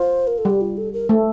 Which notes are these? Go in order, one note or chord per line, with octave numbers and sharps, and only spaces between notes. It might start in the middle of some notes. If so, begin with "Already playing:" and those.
Already playing: F4 C5
A#4
A4
G3 G4
F4
A4
A#4
A3